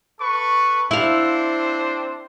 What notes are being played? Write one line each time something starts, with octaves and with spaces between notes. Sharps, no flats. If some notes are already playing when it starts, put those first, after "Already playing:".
A4 B4 C#6
C4 D4 E4 C5 F5